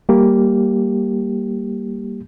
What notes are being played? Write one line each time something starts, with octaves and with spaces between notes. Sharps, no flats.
G3 A#3 G4